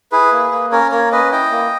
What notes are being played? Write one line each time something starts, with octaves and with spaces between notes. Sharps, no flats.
E4 G#4 B4
A#3
A#3
C#4 A#4 C#5
A#3 A#4 C#5
C#4 B4 D#5
E4 D#5 G5
A#3